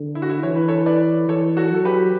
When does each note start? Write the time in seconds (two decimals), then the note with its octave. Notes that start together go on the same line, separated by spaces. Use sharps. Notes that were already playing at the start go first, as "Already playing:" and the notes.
Already playing: D3
0.15 E4
0.22 F#4
0.29 E4
0.43 E3 C#5
0.56 B4
0.68 A4 C#5
0.86 B4 D5
1.28 E3 A4 C#5
1.57 F#4 A4
1.72 F#3 A4
1.85 G4 B4